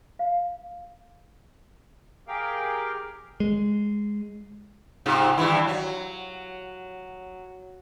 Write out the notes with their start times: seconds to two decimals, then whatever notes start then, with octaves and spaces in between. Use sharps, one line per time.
0.19 F5
2.28 G4 G#4 A#4 F5 G5
3.40 G#3
5.06 G#2 C3 F4
5.37 G2 E3 E4
5.68 F#3